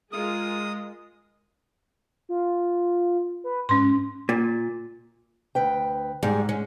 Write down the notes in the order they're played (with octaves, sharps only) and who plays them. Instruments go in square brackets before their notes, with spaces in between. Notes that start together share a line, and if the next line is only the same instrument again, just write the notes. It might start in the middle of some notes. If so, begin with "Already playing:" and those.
[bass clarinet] G#3 [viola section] F4 G#4 A#4 [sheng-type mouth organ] D#6
[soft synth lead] F4
B4
[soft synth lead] G#2 [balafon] C#4 C6
[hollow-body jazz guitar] A#2
[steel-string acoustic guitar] D2 B4 G5
[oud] G#2 [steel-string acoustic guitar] G3 G#4
[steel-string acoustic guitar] G#3 [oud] C#4